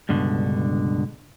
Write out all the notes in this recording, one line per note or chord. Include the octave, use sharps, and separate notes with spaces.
C#2 G2 B2 D3